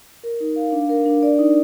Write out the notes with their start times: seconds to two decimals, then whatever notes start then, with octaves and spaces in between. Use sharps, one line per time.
0.23 A#4
0.40 D#4
0.56 F5
0.72 D4
0.89 A#4
1.06 D4
1.23 D5
1.39 D#4